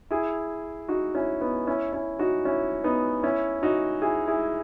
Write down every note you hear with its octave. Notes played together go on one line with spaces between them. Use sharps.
E4 G#4
D#4 F#4
C#4 E4
B3 D#4
C#4 E4
C#4 E4
D#4 F#4
C#4 E4
B3 D#4
C#4 E4
D#4 F#4
E4 G#4
E4 G#4